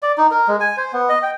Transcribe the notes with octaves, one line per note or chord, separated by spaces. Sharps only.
D5
D#4
A#4
G#3
G#5
C5
B3
D#5
G5